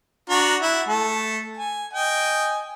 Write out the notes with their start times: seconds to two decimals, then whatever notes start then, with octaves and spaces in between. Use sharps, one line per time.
0.30 D4 F#4 A#5
0.62 E4 F#5
0.88 A3 A5
1.57 G#5
1.93 D#5 G5 G#5